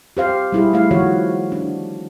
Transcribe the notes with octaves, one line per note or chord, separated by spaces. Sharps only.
G4 C5 F5
G3 E4 G#4
A3 E4 F5
D#3 F3 F#4 C#5
D4